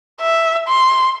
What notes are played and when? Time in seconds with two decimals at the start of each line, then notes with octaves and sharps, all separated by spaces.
0.21 E5
0.68 C6